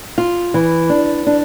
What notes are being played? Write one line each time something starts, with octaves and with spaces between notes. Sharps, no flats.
F4
E3
D4
D4